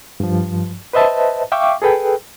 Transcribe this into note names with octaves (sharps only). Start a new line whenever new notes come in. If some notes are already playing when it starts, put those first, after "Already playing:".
G2 F3
B4 C5 D#5 E5 A5
E5 F5 G5 C#6 D6
G#4 A4 B4 G5